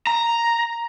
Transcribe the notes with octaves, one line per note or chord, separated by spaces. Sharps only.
A#5